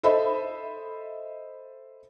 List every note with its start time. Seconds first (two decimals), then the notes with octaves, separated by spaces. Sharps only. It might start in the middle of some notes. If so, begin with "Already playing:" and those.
0.03 A4 C5 D#5 E5 B5